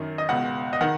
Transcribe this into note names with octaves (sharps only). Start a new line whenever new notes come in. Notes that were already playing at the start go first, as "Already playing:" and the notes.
Already playing: F#2 D#3
D#5
C#2 B2 F#5
D#5
D#3 F#5